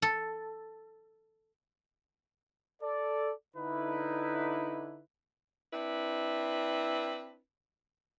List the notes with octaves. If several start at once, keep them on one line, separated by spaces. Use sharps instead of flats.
A4
A4 D5
D3 D#4 E4 B4
C4 D4 E4 B4